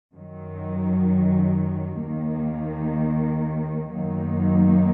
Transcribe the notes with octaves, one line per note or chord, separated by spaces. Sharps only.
F#2 D#3 F#3
D#2 D#3 A#3
F#2 D#3 F#3 A#3 D#4